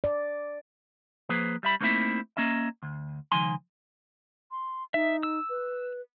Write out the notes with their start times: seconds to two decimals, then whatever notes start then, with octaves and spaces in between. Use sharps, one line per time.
0.04 D5
1.29 F3 A#3 G#4 B4 C5
1.63 G3 E5 B5
1.81 A3 A#3 C4 D#4 E4 E5
2.37 A#3 C#4 D#5 E5
2.83 D2
3.32 C#2 D#3 F3 G#5 C6
4.51 C6
4.94 D#4 E5
5.23 E6
5.50 B4